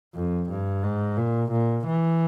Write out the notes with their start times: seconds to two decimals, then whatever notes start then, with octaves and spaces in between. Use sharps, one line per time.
0.15 F2
0.50 G2
0.83 G#2
1.17 A#2
1.52 A#2
1.87 E3